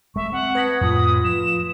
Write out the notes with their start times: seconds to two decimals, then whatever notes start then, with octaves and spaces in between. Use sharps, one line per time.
0.16 G#3 A3 E5 C#6
0.32 C4 F#5
0.55 B4 A5 D#6 G#6 A#6 B6
0.81 F2 A2 F4 D#6
1.24 F3 E7